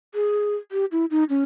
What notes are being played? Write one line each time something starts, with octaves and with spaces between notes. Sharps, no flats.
G#4
G4
E4
D#4
C#4